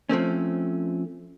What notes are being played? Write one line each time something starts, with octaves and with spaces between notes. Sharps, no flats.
F3 A3 C4 C#4